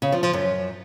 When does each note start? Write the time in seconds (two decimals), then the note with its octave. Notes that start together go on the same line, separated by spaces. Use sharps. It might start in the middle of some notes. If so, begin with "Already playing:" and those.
0.02 C#3
0.12 F3
0.23 F3
0.33 F#2